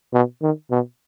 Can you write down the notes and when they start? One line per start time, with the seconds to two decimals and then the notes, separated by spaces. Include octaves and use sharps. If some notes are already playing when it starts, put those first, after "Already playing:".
0.13 B2
0.42 D#3
0.71 B2